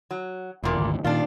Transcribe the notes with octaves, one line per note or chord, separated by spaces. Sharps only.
F#3
E1 E2 A#2 D3
G#1 D2
A#2 D#3 D4 F4